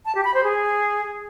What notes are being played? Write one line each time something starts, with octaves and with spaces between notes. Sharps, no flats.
A5
G4
B5
C5
G#4